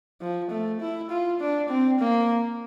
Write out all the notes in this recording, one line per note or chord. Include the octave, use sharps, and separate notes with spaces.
F3
A3
E4
F4
D4
C4
A#3